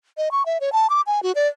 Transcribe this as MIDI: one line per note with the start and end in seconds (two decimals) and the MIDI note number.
0.17 0.29 75
0.32 0.45 85
0.46 0.58 76
0.61 0.72 73
0.73 0.87 81
0.90 1.01 86
1.07 1.22 80
1.23 1.32 66
1.35 1.48 74